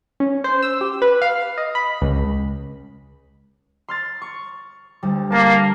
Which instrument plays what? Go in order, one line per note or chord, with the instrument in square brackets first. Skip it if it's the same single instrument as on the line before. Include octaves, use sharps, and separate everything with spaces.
[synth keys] C#4
C5
E6
G4
B4
F5
D#5
B5
C#2
[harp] C6 F6 A6
C#6
D2 G3
[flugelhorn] A#3 [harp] A5 D6